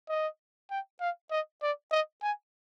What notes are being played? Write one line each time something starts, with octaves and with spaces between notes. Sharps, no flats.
D#5
G5
F5
D#5
D5
D#5
G#5